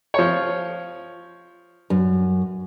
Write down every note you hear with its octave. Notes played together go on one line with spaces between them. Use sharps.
F3 C#5
F#2